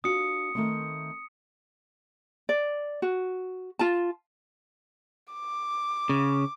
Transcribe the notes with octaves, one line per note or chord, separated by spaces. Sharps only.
D4 F4 F#4 D#6 C#7
D#3 A3 C4
D5
F#4
F4 A5
D6
C#3